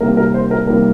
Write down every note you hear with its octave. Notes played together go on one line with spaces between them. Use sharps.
C3 D#3 G3 A#3 A#4
A#4
C5
A#4
C3 D#3 G3 A#3 A#4